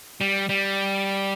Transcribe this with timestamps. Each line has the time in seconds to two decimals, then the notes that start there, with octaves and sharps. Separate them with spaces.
0.21 G3
0.49 G3